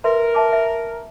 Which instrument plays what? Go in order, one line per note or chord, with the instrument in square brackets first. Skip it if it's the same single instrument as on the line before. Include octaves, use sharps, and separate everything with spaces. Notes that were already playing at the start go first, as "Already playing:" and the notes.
[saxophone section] A#4 [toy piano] B4 E5 C6
[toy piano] E5 A5 D6
E5